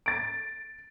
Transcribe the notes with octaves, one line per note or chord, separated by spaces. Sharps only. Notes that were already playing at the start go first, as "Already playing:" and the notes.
A6 D7